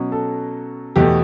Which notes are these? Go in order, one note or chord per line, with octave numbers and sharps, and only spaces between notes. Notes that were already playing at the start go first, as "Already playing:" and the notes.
Already playing: B2 F#3 C#4
A4
E2 B2 A3 G4